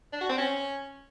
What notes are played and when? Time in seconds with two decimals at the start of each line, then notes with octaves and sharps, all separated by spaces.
0.12 D4
0.21 F#4
0.29 C4
0.38 C#4